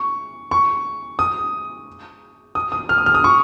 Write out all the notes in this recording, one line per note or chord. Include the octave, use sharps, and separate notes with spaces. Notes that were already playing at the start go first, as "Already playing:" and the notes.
Already playing: C#6
C#6
D#6
D#6
D#6
F6
D#6
F6
D#6
C#6